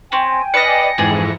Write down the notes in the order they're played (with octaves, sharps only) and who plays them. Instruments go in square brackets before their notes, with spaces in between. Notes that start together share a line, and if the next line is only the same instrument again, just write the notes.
[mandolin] C4 C#4 [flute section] G5 G#5
[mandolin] D4 B4 F5 [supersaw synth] D5 D#5 [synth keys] A#6 C#7
[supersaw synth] F2 G#2 E3 [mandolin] D4 G#4